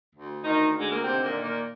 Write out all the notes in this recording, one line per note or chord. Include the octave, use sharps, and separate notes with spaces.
D2
D2 D#3 D#4
D3
G#3
A#3
C3 D#3 C4
A#2 A#3
D#3
A#2 A#3